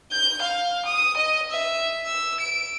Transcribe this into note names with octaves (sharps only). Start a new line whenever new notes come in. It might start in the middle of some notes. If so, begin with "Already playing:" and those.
G6
F5
D#6
D#5
E5
E6
D7